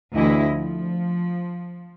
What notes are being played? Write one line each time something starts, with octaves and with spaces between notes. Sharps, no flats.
D2 E3 E4 D#5
F3